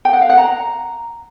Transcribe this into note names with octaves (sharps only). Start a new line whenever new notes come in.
G5
F#5
F5
F#5
A#5